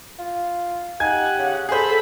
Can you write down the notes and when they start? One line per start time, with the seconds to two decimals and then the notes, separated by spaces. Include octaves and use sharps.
0.19 F4
1.00 D#4 G4 F#5 G#5 G#6
1.39 C#3
1.69 G#4 A4 C5 B5